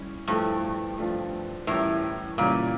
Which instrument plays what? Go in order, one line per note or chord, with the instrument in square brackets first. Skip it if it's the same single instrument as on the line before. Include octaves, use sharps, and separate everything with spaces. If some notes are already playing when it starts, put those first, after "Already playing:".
Already playing: [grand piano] G3 C#4 E4
[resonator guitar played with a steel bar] G2 [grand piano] F3 A3 E4 A4
[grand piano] F3 A3 D4 F4
[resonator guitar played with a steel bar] A2 [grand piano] E3 G3 C#4 G4 A#4
[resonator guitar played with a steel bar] A#2 [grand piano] C#3 E3 G3 C#4 G4